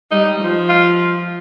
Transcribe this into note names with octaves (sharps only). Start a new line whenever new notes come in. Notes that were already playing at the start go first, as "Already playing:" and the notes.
G3 D#4
F3
F4